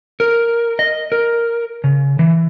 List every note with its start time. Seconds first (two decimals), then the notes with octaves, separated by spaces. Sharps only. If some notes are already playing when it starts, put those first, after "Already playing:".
0.20 A#4
0.79 D#5
1.12 A#4
1.84 C#3
2.19 E3